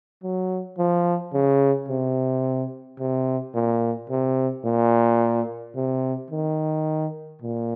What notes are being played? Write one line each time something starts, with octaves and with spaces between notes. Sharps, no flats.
F#3
F3
C#3
C3
C3
A#2
C3
A#2
C3
D#3
A#2